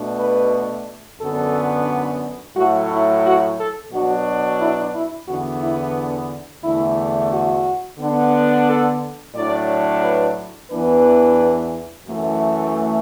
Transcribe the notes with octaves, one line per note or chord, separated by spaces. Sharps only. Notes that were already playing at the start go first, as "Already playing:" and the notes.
Already playing: B2 A3 D4
B4
F#2 D3 B3 D4 A4
A2 F#3 A3 F#4
E4
F#4
A4
B2 F#3 D4 F#4
E4
E4
E2 D3 B3 D4 F#4
E4
E2 D3 A3 D4 E4
F#4
D3 B3 D4
A4
A2 F#3 D4 D5
B4
E2 E3 B3 D4 B4
F#2 E3 A3